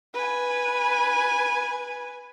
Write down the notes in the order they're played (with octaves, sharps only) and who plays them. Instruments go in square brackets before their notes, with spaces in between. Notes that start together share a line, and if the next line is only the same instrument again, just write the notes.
[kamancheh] B4 G#5